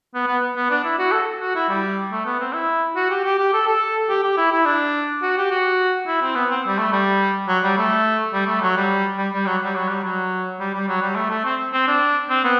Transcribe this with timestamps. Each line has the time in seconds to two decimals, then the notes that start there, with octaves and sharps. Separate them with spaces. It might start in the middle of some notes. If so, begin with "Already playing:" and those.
0.14 B3
0.27 B3
0.56 B3
0.70 D4
0.84 E4
0.99 F#4
1.12 A4
1.40 F#4
1.55 E4
1.69 G3
2.12 A3
2.25 B3
2.40 C4
2.53 E4
2.96 F#4
3.10 G4
3.24 G4
3.39 G4
3.53 A4
3.67 A4
4.09 G4
4.23 G4
4.37 E4
4.52 E4
4.66 D4
5.22 F#4
5.37 G4
5.51 F#4
6.07 E4
6.22 C4
6.35 B3
6.50 C4
6.67 G3
6.78 A3
6.92 G3
7.48 F#3
7.63 G3
7.77 A3
8.33 G3
8.47 A3
8.62 F#3
8.76 G3
9.18 G3
9.33 G3
9.46 F#3
9.64 G3
9.75 F#3
9.89 G3
10.03 F#3
10.59 G3
10.74 G3
10.88 F#3
11.02 G3
11.15 A3
11.30 A3
11.45 C4
11.72 C4
11.87 D4
12.29 C4
12.44 B3